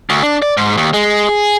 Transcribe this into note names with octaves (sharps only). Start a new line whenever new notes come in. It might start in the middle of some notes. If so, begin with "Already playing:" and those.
D2
D4
D5
G#2
D#2
G#3
G#4